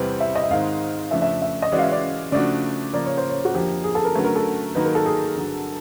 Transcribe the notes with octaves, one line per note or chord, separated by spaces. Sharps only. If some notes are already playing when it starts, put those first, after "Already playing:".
Already playing: E2 C3 E3 G3 C4
E5
D#5
E5
G#2 D#3 G#3 C4 D#4 F5
F2 C#3 F3 A3 D4 E5
E5
E5
D#5
E3 G#3 C#4 F#4 D5
F5
E5
D5
C#3 F3 A3 D4 F#4 D5
C#3 F3 A#3 D5
C#5
C5
C#5
F#4
F2 D3 F3 A#3 G4
G#4
A4
A#4
D3 F#3 A3 C#4 B4
A#4
A4
D#3 F#3 A#3 D#4 B4
A#4
A4
G#4
G2 D3 F#3